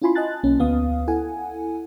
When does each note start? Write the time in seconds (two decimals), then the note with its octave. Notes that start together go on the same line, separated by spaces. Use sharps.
0.02 C#4 E4 F4 G#5 B5 C6
0.15 D#5 G#5 A5 F#6 A6
0.43 B1 A#3 C#4
0.59 D2 B3 F5 D#6
1.08 E4 A4 F#5 G#5